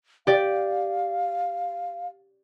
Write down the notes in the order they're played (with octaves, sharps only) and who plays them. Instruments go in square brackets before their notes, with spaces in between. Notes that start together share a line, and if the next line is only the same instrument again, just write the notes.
[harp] G4 D5 [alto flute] F5